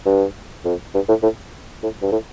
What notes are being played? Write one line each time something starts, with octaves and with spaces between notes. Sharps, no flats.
G2
F2
G2
A2
A2
A2
G2
A2